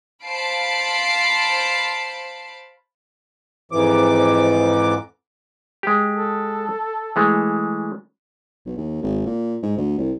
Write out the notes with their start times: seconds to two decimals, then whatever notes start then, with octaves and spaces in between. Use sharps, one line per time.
0.24 C5 F5 A5 B5 C7 D7
3.72 F2 G#2 E3 D6
5.83 G#3 G4
6.15 A4
7.16 E3 G#3 A3
8.66 B1
8.78 D#2
9.03 G#1
9.26 A#2
9.63 G#2
9.78 D2
9.98 C2